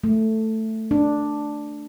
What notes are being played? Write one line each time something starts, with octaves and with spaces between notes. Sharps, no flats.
A3
D4